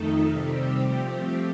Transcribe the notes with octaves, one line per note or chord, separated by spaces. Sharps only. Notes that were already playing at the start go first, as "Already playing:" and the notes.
Already playing: F2 D#3 A3 D#4 A4
C3 G3 C4 G4
F3 A3 C4 G4